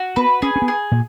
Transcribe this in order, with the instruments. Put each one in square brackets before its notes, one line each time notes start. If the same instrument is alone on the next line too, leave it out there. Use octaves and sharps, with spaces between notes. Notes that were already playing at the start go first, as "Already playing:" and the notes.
Already playing: [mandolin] F#4
[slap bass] B3 [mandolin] B4
[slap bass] C#4 [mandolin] G#4
[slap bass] C#4
B3
[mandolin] G#4
[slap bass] A#2